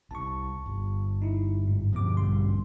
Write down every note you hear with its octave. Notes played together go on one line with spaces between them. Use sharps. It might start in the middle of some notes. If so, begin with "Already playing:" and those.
C2 A5 C#6
G1
D#4 E4
G#2
G2 B2 D3 F3 D6
A1 G3 C6